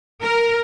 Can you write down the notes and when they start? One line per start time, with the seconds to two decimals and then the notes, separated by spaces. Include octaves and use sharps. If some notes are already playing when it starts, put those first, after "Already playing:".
0.22 A#4